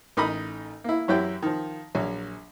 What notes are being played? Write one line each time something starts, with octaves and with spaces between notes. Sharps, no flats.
A1 D#4 A#4 B5 D#6
A#3 E4
F#2 E3 F#3 E4 G4 G5
D#3 F3
A#1 F#3